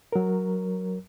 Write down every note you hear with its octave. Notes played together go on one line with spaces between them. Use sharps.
F#3 A#4